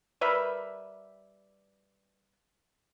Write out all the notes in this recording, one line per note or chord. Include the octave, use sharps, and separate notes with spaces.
G3 A#4 B4 E5